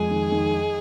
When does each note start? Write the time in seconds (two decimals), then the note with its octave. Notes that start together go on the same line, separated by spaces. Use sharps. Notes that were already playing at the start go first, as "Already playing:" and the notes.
Already playing: F2 G#3 G#4
0.11 D#3
0.32 D#3
0.54 D#4